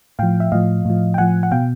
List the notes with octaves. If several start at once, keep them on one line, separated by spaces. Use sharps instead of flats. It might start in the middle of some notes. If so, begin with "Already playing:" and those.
A2 F3 F5 G5
E5
A2 F3 D#5 F5
A2 F3
G5
A2 F3 F#5 G#5
F#5
B2 F5 G5